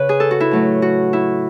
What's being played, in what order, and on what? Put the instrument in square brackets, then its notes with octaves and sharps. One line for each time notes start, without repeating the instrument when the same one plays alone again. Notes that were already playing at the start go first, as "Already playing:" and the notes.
Already playing: [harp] C#3 B4 C#5
G#4
A4
F#4
E4
A2 F#3 A3
F#4
E4